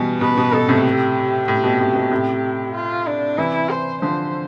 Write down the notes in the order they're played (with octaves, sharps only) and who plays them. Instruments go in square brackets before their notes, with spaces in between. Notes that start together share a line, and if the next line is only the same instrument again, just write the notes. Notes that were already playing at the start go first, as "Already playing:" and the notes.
Already playing: [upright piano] B2 E3 G3
[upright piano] B2 [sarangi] B4
[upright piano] B2
[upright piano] B2 [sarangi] A4
[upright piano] A2 C3
[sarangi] G4
[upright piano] A2
B2
A2
B2
A2 C3
[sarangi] F4
D4
[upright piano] C3 E3 [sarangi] E4
[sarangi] C5
[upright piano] D3 F3 [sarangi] C5